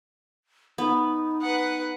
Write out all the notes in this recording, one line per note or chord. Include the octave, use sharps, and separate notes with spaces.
B3 D#4
B4 F#5